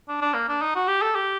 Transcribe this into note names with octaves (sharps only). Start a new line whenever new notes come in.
D4
D4
A#3
D4
D#4
F#4
G4
A4
G4